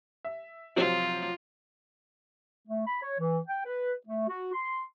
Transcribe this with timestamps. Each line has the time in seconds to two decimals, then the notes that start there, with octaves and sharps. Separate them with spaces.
0.25 E5
0.76 C3 F3 F#3 F4
2.68 A3
2.86 B5
3.02 C#5
3.19 E3
3.48 G5
3.65 B4
4.06 A3
4.28 F#4
4.53 C6